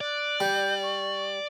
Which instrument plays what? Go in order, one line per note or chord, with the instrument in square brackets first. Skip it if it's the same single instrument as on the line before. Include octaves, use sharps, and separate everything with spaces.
[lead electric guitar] D5 [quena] F#6
[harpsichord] G3 [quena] G6
[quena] C#6